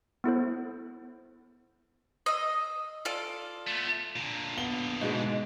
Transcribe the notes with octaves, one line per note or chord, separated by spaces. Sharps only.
B3 E4 A4 C5
D#5 E6
F4 A4 D5
A3 B3
A#2 D3
B3 G7
G#2 B2 G#3